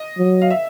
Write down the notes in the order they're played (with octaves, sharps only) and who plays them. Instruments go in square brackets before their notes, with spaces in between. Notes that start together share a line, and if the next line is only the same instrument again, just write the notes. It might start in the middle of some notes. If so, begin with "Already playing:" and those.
Already playing: [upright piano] D#5
[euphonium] F#3
[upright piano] F5
E5